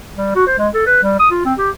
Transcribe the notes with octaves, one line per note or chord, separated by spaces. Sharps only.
G3
F#4
C5
G#3
A4
B4
G3
D#6
F4
C4
G4